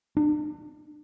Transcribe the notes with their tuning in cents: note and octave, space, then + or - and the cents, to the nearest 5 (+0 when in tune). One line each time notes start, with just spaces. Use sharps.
D4 +40